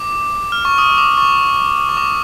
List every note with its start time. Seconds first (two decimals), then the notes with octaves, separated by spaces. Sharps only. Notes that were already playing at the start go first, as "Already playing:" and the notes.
Already playing: D6
0.52 F6
0.65 C#6
0.78 D#6
0.98 D6
1.18 C#6
1.89 C#6
1.97 D6